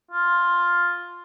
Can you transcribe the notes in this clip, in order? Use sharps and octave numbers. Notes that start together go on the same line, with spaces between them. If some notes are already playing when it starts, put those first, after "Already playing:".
F4